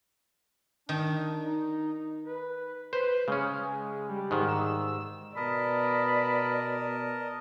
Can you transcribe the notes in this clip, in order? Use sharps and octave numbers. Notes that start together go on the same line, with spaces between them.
D#3 D4
D#4
B4
B4 C5
C#3 G#3 C#4
G3
G#2 D#3
E6
B2 A#4 D5 D#5 A5 B5